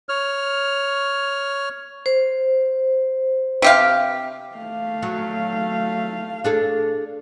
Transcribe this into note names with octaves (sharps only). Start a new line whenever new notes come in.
C#5 F6
C5
C3 G4 F5
A3 F5
F#3
D4 G#4 A4